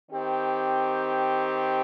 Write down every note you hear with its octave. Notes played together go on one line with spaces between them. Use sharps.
D#3 C4 G4